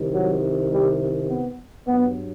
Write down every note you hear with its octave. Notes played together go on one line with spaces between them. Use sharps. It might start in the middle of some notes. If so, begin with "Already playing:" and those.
Already playing: C2 C3 D#3
F#3
G3
B3
G2 F#3 B3